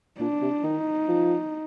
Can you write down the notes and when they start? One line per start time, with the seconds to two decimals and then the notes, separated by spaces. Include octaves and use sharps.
0.19 A#2 D4
0.42 C3
0.63 D#3 D#4
1.08 F3